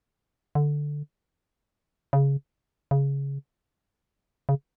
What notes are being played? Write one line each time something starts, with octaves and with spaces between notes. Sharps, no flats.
D3
C#3
C#3
C#3